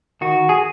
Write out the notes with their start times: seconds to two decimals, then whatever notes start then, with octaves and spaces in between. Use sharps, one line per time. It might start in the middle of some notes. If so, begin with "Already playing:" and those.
0.21 D#3 F#4
0.49 G#4